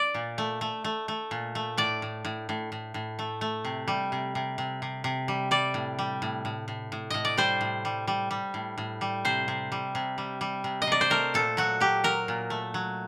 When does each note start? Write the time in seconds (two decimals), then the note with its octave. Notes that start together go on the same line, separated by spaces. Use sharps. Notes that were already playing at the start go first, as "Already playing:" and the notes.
Already playing: D5
0.14 A#2
0.38 A3
0.61 A3
0.84 A3
1.08 A3
1.31 A#2
1.55 A3
1.77 A2 D5
2.02 A2
2.25 A2
2.49 A2
2.72 A2
2.94 A2
3.19 A3
3.41 A3
3.65 C3
3.88 G3
4.12 C3
4.35 C3
4.58 C3
4.82 C3
5.04 C3
5.28 G3
5.51 G3 D5
5.74 A2
5.99 G3
6.22 A2
6.45 A2
6.68 A2
6.92 A2
7.10 A2 D#5
7.25 D5
7.37 G3 C5
7.61 A2
7.85 G3
8.07 G3
8.31 G3
8.54 A2
8.78 A2
9.01 G3
9.25 C3 C5
9.48 C3
9.72 G3
9.95 C3
10.18 G3
10.41 G3
10.64 C3
10.82 D#5
10.87 C3 D5
11.01 C5
11.10 A3 A#4
11.34 A#2 A4
11.57 F#3 F#4
11.80 F#3 G4
12.04 F#3 A#4
12.28 A#2
12.50 A3
12.74 F#3